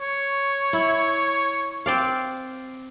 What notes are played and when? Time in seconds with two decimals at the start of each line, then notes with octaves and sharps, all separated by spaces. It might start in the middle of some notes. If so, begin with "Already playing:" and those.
0.01 C#5
0.73 E4
1.86 C4 D5 F5